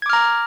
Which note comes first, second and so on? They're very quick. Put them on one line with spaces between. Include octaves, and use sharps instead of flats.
G#6 D6 F6 A#5